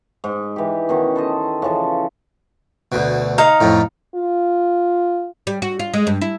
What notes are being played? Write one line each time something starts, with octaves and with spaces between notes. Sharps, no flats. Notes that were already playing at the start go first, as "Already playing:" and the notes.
G#2
E3 G4
B2 D#3 C#4
A4 C5 D#5
C#3 E3 F3 A4
D2 B2
D#4 F5 A#5
F2 A2
F4
G3
F#4
F4
G#3
G2
E4